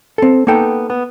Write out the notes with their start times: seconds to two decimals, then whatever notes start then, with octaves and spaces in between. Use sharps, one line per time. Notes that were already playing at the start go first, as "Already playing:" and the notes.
0.18 C4 A4
0.47 A#3 B3 D#4 A4 G5
0.90 B3